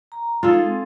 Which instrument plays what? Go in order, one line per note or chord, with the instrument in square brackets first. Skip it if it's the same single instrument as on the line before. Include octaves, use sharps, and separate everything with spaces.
[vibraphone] A#5
[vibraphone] G#3 D#4 [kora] F4 G#4 A4
[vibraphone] C4